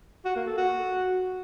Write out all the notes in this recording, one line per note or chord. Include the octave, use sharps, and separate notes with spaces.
F#4
A#3
A4
F#4